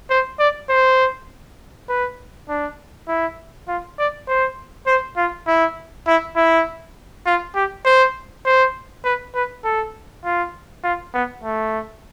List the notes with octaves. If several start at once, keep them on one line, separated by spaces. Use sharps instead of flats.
C5
D5
C5
B4
D4
E4
F4
D5
C5
C5
F4
E4
E4
E4
F4
G4
C5
C5
B4
B4
A4
F4
F4
B3
A3